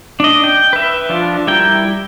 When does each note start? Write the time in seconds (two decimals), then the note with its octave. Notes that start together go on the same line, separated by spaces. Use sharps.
0.20 D4 D#5
0.44 G5
0.73 B4 E5
1.09 F3 D4 F4
1.47 G3 E4 A#4 G5